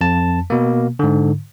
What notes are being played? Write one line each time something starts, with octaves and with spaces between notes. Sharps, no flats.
F2 A5
B2 A#3
G#2 D3